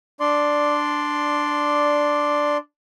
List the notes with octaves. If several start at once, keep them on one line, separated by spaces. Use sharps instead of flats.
D4 D5 C6